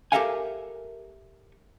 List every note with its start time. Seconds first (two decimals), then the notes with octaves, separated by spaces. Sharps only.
0.12 G4 A4 A#4 E5 F5 G#5